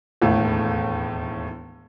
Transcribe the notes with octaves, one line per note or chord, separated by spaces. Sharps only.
E1 D#2 A2 A3